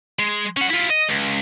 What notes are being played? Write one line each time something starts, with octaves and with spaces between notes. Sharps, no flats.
G#3
C#4 F#5
E4 F4
D#5
C#2